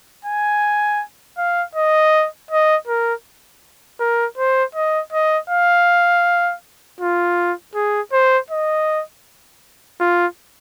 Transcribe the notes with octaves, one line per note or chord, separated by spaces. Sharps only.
G#5
F5
D#5
D#5
A#4
A#4
C5
D#5
D#5
F5
F4
G#4
C5
D#5
F4